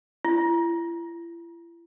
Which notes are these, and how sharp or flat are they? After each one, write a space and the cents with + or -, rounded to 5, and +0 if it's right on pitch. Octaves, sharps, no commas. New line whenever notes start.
E4 +40